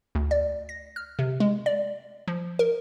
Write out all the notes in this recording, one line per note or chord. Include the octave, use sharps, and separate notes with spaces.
D2
D5
A#6
F6
C3
G#3
D5
F3
A#4